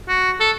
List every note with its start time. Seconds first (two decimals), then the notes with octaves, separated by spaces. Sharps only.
0.09 F#4
0.40 A4